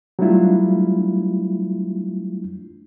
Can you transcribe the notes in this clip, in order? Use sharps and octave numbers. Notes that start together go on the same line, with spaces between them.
F#3 G3 A3 D4 E4 F4